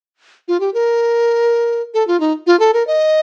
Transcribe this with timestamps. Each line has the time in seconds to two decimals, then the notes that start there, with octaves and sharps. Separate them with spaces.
0.48 F4
0.60 G4
0.74 A#4
1.94 A4
2.07 F4
2.20 D#4
2.47 F4
2.60 A4
2.74 A#4
2.87 D#5